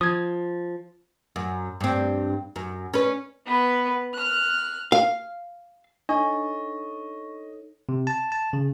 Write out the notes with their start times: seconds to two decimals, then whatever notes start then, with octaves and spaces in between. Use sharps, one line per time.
0.01 F3 D#6 G#6
1.36 F#2
1.81 G2 C4
2.56 F#2
2.94 C#4 B4
3.47 B3 B4
4.14 F6 F#6
4.92 F5
6.09 D4 D#4 A4 C#5 D#5 C#6
7.89 C3
8.07 A5
8.32 A5
8.53 C#3